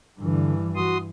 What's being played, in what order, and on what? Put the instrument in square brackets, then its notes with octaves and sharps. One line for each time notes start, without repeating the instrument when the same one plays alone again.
[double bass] G2 E3 [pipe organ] D3
[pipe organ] F#4 C6 D#6